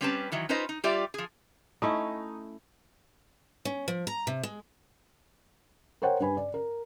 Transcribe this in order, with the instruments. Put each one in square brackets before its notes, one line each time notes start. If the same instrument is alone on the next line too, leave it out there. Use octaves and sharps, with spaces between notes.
[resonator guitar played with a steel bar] G3 C4 C#4 G4 B4 A5
D#3 E3 F#3
C#4 D#4 F4 B4 C5 D#5
D#4
G3 F4 G4 D5 E5
F3 G#4
[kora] A3 C#4 E4 [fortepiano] D#4
[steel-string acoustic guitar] C#4
F3
A#5
C3
G#3
[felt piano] A#4 C5 C#5 F#5 G5
G2 B4 G#5 B5
D5
A#4